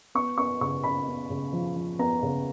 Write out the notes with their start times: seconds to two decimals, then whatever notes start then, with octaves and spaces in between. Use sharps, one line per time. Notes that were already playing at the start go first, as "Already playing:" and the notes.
0.15 B3 C#6
0.38 B3 C#6
0.61 C#3 C#6
0.84 C#3 B5
1.08 B3
1.30 C#3
1.53 F3
1.76 F3
1.99 B3 A#5
2.23 C#3